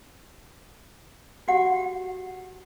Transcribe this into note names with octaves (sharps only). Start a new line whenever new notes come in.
F#4 G4 F#5